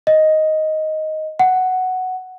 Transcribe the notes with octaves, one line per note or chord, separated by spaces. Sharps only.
D#5
F#5